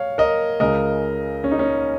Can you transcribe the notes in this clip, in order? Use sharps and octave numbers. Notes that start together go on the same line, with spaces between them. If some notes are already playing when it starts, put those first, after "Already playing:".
Already playing: C#5 F5
A#4 D#5
C#2 C#3 G#3 A#4 D#5
C#4
D#4
C#4